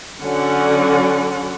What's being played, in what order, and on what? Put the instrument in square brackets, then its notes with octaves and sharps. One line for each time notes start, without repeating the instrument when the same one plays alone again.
[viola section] D3 F#3 C#4 D5 F#5